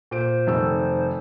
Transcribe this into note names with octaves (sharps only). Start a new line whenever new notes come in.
A#2 C5 D7
F1 D#3 E6